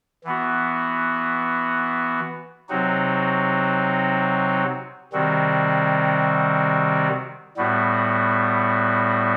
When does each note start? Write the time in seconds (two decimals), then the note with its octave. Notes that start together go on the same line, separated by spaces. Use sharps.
0.24 E3 B3 F#4
2.69 C3 F#3 C4 D#4 F#4
5.13 C3 D#3 G3 C4 F#4
7.57 A2 G3 B3 F#4